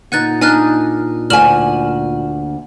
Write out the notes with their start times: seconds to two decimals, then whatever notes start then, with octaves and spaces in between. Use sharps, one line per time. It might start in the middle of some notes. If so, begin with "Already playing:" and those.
0.12 A#2 D#4 F#5 G#5 F#6 A6
0.41 D4 D#4 G#5 F6 F#6
1.30 D2 G#5 F6 E7 F#7